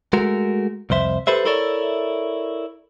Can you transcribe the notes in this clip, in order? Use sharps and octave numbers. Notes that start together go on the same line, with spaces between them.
G#3 A3 F#4 A#4
C2 F2 C5 E5
G4 A4 B4 C5 E5
E4 A4 A#4 C#5 D5 E5